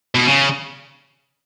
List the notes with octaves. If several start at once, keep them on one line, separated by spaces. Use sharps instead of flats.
B2
C#3